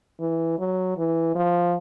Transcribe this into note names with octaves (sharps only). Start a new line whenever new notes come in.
E3
F#3
E3
F3